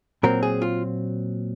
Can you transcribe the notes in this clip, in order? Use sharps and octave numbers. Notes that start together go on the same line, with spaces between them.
A#2 F#3 C4 A#4
G#4
F4